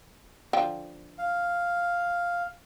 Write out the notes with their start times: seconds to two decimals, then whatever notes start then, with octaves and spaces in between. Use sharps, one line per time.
0.53 D3 F3 G5
1.18 F5